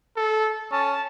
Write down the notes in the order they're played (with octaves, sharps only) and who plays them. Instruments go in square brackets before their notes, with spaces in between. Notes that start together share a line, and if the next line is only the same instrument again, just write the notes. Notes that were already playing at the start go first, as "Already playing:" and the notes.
[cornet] A4
[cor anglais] C#4 [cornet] A5